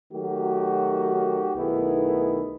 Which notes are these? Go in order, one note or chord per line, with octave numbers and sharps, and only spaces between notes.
D#3 F#3 A3 F#4 G4 A#4
B1 D#3 A3 B3 E4 G#4